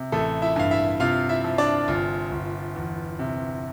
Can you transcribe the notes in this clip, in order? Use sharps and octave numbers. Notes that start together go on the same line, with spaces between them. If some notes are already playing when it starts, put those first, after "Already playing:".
Already playing: C3
A1 A3 A4
E4 E5
G2 F5
E4 E5
C3 F4 F5
E4 E5
F3
D4 D5
G1 F4
G1
E2
C3